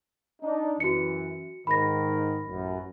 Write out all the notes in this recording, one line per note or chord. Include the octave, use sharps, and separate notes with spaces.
D4 D#4
F#2 E3 F#4 C#7
G#2 D#3 B5 A#6
A1 F#2